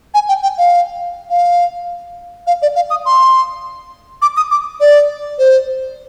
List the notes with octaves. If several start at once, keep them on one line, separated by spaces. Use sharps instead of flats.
G#5
G5
G5
F5
F5
F5
D5
F5
D#6
C6
D6
D#6
D6
D5
C5